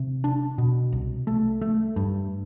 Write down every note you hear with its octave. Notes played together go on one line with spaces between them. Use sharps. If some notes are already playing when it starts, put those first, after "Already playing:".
Already playing: C3
D4
B2
C2
A3
A3
G2